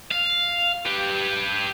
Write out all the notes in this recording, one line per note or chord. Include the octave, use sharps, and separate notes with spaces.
F5
G4 B4